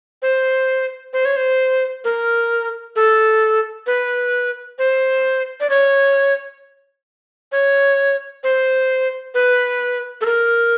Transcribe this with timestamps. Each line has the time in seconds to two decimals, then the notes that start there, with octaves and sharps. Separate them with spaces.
0.22 C5
1.13 C5
1.25 C#5
1.36 C5
2.04 A#4
2.96 A4
3.87 B4
4.79 C5
5.60 D5
5.70 C#5
7.52 C#5
8.44 C5
9.34 B4
10.21 A4
10.26 A#4